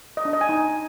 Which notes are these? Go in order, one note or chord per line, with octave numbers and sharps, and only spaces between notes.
D#5
D4
D#5
G#5
D#4